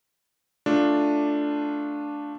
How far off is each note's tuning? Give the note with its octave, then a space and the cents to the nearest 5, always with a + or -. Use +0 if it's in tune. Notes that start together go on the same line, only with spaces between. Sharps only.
A3 +0 D4 +0 F4 +0